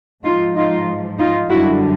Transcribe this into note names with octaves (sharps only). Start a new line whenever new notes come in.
G#2 F3 D#4 F4
D#4 F4
D#4 F4
F#2 D3 G3 E4 F#4